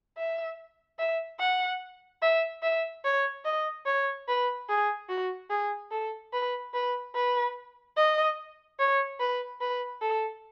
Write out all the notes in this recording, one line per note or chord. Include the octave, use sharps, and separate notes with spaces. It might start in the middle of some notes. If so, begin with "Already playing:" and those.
E5
E5
F#5
E5
E5
C#5
D#5
C#5
B4
G#4
F#4
G#4
A4
B4
B4
B4
D#5
C#5
B4
B4
A4